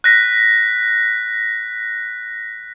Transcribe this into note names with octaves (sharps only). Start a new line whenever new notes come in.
F#6 A#6 B6